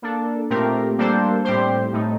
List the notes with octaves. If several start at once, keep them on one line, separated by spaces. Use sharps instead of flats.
A#3 D4 A4
A#2 A3 C4 G4 A#4
G3 A#3 D4 A4 C5
A2 G3 C4 G4 C5
A2 A3 D#4